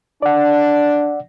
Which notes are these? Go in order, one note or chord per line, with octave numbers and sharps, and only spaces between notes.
D4 D5 F#5